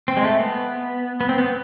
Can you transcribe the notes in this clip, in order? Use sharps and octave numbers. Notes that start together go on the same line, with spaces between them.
C4
G#3
A3
B3
B3
C4
B3